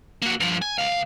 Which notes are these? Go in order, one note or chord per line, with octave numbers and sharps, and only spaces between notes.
A#3 F#4
G2 F3
G#5
C#2 F5